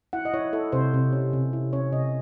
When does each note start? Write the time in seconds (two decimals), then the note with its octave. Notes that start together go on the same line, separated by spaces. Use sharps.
0.13 E4 F#5
0.25 D#5
0.34 E4 C#5
0.53 E4 A4
0.72 C3 C5
0.94 C3
1.13 C#4
1.33 C3
1.53 E4
1.73 C#4 C#5
1.92 C3 D#5